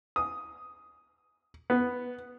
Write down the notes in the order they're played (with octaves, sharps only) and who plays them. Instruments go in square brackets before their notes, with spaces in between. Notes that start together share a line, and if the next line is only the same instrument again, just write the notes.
[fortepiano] D#6
B3